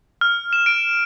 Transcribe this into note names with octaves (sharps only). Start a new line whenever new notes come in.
F6
E7
D7